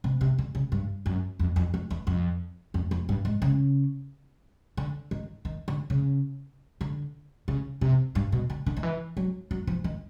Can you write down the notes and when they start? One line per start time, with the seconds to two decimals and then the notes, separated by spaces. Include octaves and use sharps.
0.04 C3
0.21 C3
0.38 D3
0.55 C#3
0.72 G2
1.06 F#2
1.39 F2
1.56 F2
1.74 F2
1.91 E2
2.07 F2
2.74 F2
2.91 F2
3.09 G2
3.25 G#2
3.42 C#3
4.77 D3
5.11 D#3
5.45 D#3
5.68 D3
5.90 C#3
6.81 D3
7.48 C#3
7.81 C3
8.15 G2
8.32 B2
8.50 D3
8.66 D3
8.77 D#3
8.83 E3
9.17 F#3
9.51 F#3
9.67 F3
9.84 D#3